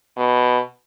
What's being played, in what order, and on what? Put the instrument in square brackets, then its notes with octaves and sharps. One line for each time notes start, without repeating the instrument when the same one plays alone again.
[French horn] B2